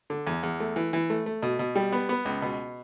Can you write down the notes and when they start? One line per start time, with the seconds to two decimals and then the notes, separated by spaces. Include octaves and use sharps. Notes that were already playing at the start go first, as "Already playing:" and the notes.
0.10 D3
0.27 E2
0.43 E2
0.60 A3
0.76 E3
0.93 E3
1.10 A3
1.26 A3
1.43 B2
1.59 B2
1.75 G3
1.92 B3
2.09 B3
2.25 C#2
2.42 B2